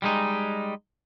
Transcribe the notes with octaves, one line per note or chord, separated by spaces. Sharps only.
G3 G#3 D#4